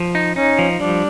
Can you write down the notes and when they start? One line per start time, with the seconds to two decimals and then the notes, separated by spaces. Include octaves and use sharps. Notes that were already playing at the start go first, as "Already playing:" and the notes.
Already playing: F3
0.15 D#4
0.36 C#4 D#4
0.59 F3
0.80 G3 D4